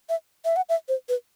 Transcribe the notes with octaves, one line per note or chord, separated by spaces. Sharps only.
E5
E5
F#5
E5
C5
B4